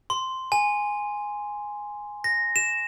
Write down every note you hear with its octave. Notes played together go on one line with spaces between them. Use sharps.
C6
G#5
A#6
E7